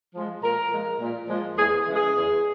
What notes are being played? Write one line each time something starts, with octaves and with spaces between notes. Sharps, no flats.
F3 G#3
A#2 A#4
F3 G#3
A#2
F3 G#3
E2 G#4
C#3 E3 G#3
G#4
E2